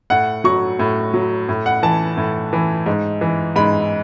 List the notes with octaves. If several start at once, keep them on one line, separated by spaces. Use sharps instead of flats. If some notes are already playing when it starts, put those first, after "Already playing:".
A2 F#5
F#3 C#6
A2
F#3
A2
F#5
E3 A5
A2
E3
G#2
E3
G#2 B5